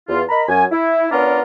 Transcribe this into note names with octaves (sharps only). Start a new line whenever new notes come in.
E2 F4
A#4 D#5 A#5 B5
F#2 G#5
E4
B3 C#4 D4 F4 A#4 D5